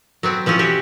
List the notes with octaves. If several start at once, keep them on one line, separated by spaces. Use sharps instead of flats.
F#3 B3 C4
E3 F3 C4 C#4
B2 F#4 G4